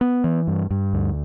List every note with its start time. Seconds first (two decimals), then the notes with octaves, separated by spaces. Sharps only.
0.01 B3
0.24 E3
0.47 G2
0.71 G2
0.93 D2